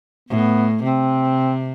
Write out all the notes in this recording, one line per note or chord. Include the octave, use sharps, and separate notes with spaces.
A2 B3
C3 C4